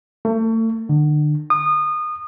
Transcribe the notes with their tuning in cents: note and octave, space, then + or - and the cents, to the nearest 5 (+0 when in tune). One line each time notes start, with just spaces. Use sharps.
A3 +35
D3 +35
D#6 -25